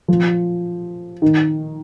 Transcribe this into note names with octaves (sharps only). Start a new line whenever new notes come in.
F3
D#3